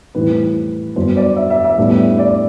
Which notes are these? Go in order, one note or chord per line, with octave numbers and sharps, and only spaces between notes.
A2 E3 G3 C4 B4
G2 F#3 B3 D4 C5
D5
E5
E5
E5
A2 G3 B3 D4
D5